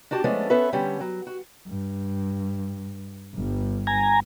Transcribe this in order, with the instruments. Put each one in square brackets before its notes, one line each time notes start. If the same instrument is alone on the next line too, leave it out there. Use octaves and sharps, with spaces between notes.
[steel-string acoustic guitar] D4 F#4 G4 A5
F3 G#3 A3 B3 C#4 D4
B3 C#4 A4 B4 E5
D3 G3 B3 C#4 G4
F#3
F#4
[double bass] G2
G1 G2
[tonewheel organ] G#5 A#5